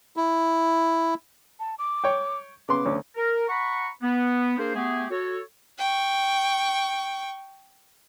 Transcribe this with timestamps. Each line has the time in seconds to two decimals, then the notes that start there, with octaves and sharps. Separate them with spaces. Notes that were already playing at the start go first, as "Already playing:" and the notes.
0.17 E4
1.60 A5
1.79 D6
2.04 C#5 G5
2.69 C#3 B3 C6 D6
2.86 D2 C#4
3.16 A#4
3.49 F#5 A#5 B5 C#6
4.02 B3
4.58 A#3 D4 G#4 A#4 C5
4.75 A3 B3 G4 G#4
5.11 F#4 A4 C#5
5.78 G5 C#6